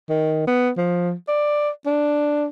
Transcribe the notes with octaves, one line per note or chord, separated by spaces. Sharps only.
D#3
B3
F3
D5
D4